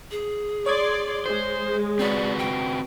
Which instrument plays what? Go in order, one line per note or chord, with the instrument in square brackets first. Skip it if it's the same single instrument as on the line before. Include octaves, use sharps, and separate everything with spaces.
[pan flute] G#4
[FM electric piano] C#5 D#6 G#6 [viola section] D5 C6
[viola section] G#3 [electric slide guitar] C5
[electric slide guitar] C4 F#4 B4 [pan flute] D5
[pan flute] G5